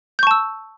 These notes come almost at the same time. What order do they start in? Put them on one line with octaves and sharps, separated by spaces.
G6 C#6 A5 E6